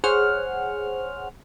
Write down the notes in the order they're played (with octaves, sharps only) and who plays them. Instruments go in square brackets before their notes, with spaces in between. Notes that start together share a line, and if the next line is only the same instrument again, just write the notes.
[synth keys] G#4 C5 C#5 F#5 F6